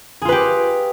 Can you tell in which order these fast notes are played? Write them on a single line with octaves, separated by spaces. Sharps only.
G#4 F4 B4 G4